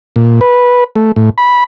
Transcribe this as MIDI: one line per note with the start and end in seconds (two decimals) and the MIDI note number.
0.16 0.40 46
0.41 0.84 71
0.96 1.12 57
1.16 1.30 45
1.38 1.64 83